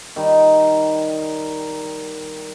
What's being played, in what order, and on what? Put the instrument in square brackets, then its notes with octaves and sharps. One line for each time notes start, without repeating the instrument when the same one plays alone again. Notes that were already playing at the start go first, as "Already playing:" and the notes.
[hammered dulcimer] D#3 G3 D#4